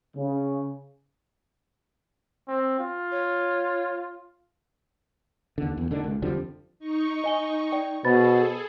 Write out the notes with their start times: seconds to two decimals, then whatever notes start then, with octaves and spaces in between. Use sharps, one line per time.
0.16 C#3
2.48 C4
2.79 F4
3.12 C#5
5.58 D#2 D3
5.77 E2
5.91 F1 D3 D#3 D4
6.04 C#2
6.22 F2 D3 F3 G3
6.79 D#4 C#6
7.24 D#5 G#5 G7
7.72 D5 G5
8.05 B2 G#4 A4 C5 B5 A6